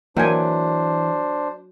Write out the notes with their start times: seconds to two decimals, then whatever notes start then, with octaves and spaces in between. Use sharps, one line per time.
0.17 E3 F#3 A#3 D4 C5 G5 G#5